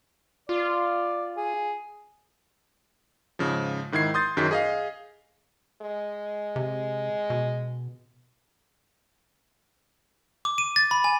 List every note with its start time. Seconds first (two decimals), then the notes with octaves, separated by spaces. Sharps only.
0.49 F4 D5
1.37 G#4
3.39 G#2 C#3 F3
3.92 G#2 D#3 E4 G#6 C7
4.14 C6 D#6 G6 A6
4.37 F#2 D#3 F#3 G#4 G6 B6
4.51 G#4 D#5 F5
5.82 G#3
6.56 C3
7.30 B2
10.45 D6
10.58 D#7
10.76 A6
10.91 B5
11.04 G#5